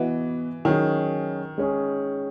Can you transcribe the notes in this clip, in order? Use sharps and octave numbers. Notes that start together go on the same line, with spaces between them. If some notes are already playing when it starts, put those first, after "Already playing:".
Already playing: E3 B3 F#4 B4 D#5
D#3 F#3 C#4 G#4 D#5
G#3 C#4 G#4